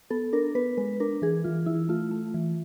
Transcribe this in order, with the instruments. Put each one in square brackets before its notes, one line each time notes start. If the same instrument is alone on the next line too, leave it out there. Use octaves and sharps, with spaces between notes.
[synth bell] B3 A4
D4 A#4
B3 B4
G#3 B4
D4 A#4
E3 G#4
E3 F4
E3 E4
A3 F4
A3
E3